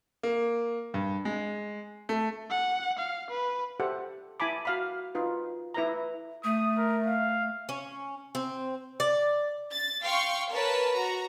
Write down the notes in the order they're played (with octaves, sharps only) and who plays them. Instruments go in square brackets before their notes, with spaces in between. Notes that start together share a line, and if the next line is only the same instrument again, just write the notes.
[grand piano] A#3
G2
G#3
A3
[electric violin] F#5
F5
B4
[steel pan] G4 A4 C5 E5 F#5
E4 G#5 A5 B5 D6
F#4 F5 B5
D#4 F4 B4
E4 B4 E5 A#5
[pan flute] A3 [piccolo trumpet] D#6
[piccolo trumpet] A#4
F5
[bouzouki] C#4
C4
D5
[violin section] A6
F5 G5 C6 C#6
A#4 B4 C#5 A5
F#4 A#5